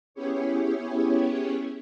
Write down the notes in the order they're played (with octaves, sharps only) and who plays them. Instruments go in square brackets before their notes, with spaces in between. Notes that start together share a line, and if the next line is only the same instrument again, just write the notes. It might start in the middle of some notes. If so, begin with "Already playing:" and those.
[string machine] B3 C#4 E4 G4 G#4 C#5